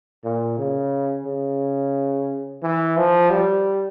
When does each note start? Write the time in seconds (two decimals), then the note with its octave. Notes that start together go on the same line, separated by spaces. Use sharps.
0.24 A#2
0.58 C#3
1.26 C#3
2.63 E3
2.97 F3
3.31 G3